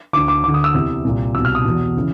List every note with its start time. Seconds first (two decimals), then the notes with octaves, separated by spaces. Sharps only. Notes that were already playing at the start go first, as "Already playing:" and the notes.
0.13 D2 D3 D6
0.28 D6
0.44 D2 D6
0.48 D3
0.54 D#6
0.64 E6
0.74 E2 C3 E3
1.04 C2 A#2
1.35 B2 E6
1.38 C2
1.45 F6
1.55 D#6
1.65 E2 B2
1.97 C#3 E3